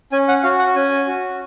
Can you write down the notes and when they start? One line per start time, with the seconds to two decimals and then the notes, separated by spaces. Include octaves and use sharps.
0.12 C#4 G#5
0.28 F#5
0.43 F#4 F5
0.59 F#5
0.76 C#4 G#5
1.08 F#4